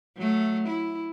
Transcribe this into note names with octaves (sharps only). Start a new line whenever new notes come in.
F#3 A3
E4